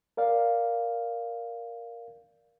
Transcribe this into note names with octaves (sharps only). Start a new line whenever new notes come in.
A#4 D5 F5